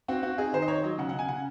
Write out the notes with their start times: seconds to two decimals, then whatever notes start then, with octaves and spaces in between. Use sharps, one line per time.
0.08 C4 F#4
0.23 C4 F#4
0.38 D#4 G#4
0.53 D#3 C5
0.62 D#5
0.68 D#3 C#5
0.83 F#3 D#5
0.98 C#3 F#5
1.09 C#3 F#5
1.19 G#5
1.28 C#3 F#5